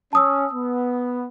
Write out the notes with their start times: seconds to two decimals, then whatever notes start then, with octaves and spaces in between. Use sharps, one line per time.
0.13 C#4 A5 D#6 E6
0.53 B3